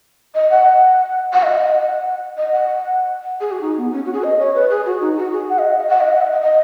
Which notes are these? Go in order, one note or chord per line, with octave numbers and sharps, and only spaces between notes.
D#5
F#5
F#5
D#5
D#5
F#5
D#5
F#5
G#4
F#4
D#4
B3
C#4
F#4
G#4
D#5
C#5
B4
G#4
F#4
D#4
F#4
G#4
F#5
D#5
F#5
D#5
F#5
D#5
F#5
D#5
D#5
D#5